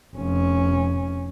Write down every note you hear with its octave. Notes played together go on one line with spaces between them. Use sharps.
F1 C#4